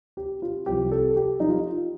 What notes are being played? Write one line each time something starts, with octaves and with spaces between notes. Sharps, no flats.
G4
F4
C2 C3 F3 G4
A4
G4
F3 D#4
F4